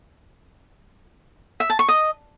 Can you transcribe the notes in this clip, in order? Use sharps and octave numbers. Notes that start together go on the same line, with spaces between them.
E5
A5
C#6
D#5